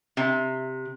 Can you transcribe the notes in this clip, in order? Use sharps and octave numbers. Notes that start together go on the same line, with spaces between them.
C3